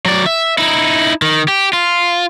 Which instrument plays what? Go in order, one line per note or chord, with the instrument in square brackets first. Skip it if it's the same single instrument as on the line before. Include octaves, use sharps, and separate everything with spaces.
[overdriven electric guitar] F#3 D5
E5
D#4 E4
D#3
G4
F4